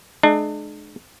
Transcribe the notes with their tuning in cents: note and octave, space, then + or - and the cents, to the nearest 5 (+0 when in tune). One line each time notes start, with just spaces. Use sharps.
G#3 +40 D4 +40